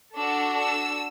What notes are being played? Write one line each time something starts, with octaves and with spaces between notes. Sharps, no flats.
D4 F#4 A4 E6
E6